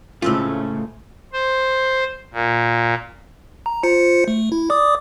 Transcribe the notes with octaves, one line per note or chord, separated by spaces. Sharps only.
C#2 A2 C#3 A3 C4 C#4 F4 G4
C5
A#2
A#5
F4 C5 C#7
A3
E4
D5 D6 D#6